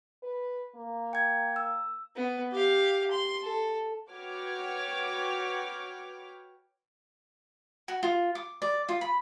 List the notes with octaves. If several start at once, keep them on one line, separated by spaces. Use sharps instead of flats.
B4
A#3
G5 G#6
E6
B3
G4 F5
C6
A4
F#4 B4 C#5 G5 D6 F6
F#4
F4
D6
D5
F4
B5